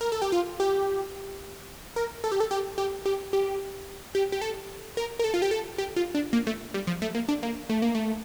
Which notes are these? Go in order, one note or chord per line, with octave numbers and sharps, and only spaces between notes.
A#4
A4
G4
F4
G4
A#4
A4
G4
A4
G4
G4
G4
G4
G4
G4
A4
A#4
A#4
A4
F4
G4
A4
G4
F4
D4
A#3
A3
G3
F3
A3
A#3
D4
A#3
A3
A#3
A3